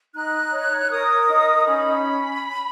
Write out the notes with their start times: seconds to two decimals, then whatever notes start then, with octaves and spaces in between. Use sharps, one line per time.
0.13 D#4 F#6
0.51 C#5
0.84 F6
0.89 A#4 D#6
1.28 D#4
1.65 C#4 B5